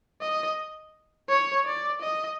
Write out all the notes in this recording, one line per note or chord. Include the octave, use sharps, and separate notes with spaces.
D#5
C#5
D5
D#5